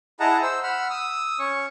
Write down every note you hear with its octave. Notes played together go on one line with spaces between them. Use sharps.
E4 G#4 D#5 F#5 A5 A#5
C5 E6
F#5 B5 E6 F6
D#6 E6
C#4 C#5 C#6